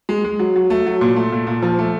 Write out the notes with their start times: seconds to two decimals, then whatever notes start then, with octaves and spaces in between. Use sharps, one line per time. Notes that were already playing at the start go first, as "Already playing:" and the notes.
0.09 G#3
0.24 G#3
0.39 F#3
0.56 F#3
0.70 A3
0.86 F#3
1.01 A#2
1.16 A3
1.32 A#2
1.47 A#2
1.62 F3
1.78 A3